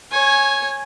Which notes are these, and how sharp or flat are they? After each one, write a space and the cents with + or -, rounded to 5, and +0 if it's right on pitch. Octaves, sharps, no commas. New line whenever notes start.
C#5 -15 G#5 +0